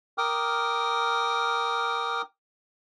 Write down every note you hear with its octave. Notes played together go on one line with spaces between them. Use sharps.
A#4 G5 D6 D#6 F6